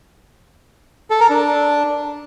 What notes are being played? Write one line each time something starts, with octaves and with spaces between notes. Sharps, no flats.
A4
A#4
D4